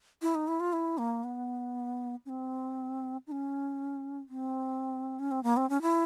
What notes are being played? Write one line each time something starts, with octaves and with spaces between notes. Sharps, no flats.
E4
D#4
E4
F4
E4
A#3
B3
C#4
C4
D#4
C#4
C4
C#4
C4
A#3
C4
C#4
E4